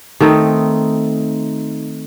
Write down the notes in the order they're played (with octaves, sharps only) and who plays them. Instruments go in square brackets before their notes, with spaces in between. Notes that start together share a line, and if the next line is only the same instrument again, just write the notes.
[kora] D#3 A3 C4 D#4